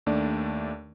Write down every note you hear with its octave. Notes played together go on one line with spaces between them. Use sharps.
D#2 A3 D4 D5